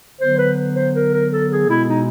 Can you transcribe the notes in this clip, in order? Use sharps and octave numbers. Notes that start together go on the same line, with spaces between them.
D3 F#3 B3 C5
B4
C5
A#4
A#4
A4
G#4
B2 G#3 B3 E4
D#4